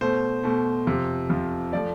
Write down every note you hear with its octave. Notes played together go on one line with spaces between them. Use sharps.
B2 A3 C5
B2 A3
F2 C3 F3
F2 C3 F3
F3 A3 D5